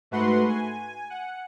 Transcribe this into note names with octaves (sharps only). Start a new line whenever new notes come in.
G#2 A3 F#4 B4 F#5 C6
G#5
F#5